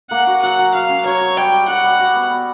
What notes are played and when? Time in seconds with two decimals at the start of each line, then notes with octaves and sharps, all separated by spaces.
0.11 A#3 F#5
0.27 F#4
0.42 F#3 F#5
0.59 F#3
0.74 F#3 F5
0.89 C#4
1.05 F#3 C#5
1.21 F#4
1.37 G3 G5
1.52 G3
1.68 F#4 F#5
1.84 G3
1.99 F#4
2.15 B3
2.30 B3